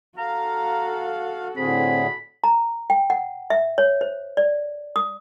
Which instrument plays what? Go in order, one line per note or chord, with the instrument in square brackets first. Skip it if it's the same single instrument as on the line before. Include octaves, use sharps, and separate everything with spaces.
[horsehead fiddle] F#4 A4 [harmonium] F5 [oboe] A#5
[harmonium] A2 D3 G#4 [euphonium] C4 [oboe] B5
[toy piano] A#5
G5
F#5
E5
C#5
C5
D5
D#6